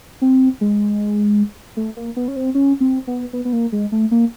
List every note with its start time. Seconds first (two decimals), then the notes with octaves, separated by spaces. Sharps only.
0.22 C4
0.61 G#3
1.77 A3
1.97 A#3
2.16 B3
2.28 C#4
2.36 C4
2.55 C#4
2.80 C4
3.07 B3
3.33 B3
3.45 B3
3.53 A#3
3.72 G#3
3.92 A3
4.11 A#3